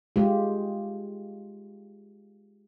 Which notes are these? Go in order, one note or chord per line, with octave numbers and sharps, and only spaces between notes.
G#3 F4 G4